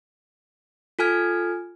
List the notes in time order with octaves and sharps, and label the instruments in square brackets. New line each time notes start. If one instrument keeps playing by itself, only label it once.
[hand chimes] F4 A4 G#5 F6 G#6